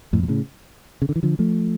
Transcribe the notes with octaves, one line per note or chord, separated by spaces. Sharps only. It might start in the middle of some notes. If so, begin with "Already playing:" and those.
F2 A2
A#2
A2 C#3
C#3
D3
E3
D3 F3
F3 A3